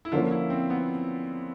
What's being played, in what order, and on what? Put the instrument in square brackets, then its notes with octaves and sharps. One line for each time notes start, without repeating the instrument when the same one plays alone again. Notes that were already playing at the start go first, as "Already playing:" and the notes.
[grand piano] E4
[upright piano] D3 F3 A#3 C#4 [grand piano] F4
[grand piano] E4
C4
B3